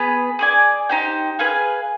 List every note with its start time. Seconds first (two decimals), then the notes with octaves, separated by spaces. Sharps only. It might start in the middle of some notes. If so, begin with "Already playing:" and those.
Already playing: B3 G#4 B4
0.39 G#4 D5 G#5
0.89 D#4 G4 C5 G5
1.39 G#4 B4 F5 G#5